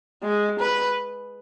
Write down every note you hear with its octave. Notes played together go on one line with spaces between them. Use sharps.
G#3
B4